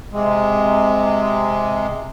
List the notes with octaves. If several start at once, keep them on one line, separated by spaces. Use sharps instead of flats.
C3 G#3